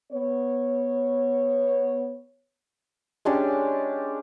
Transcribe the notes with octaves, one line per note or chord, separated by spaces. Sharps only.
B3 C#5
G#3 C#4 D4 G4